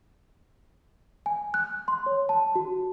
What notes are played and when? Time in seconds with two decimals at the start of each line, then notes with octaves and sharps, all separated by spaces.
1.26 G#5
1.54 F#6
1.88 C6
2.06 C#5
2.29 A5
2.56 F#4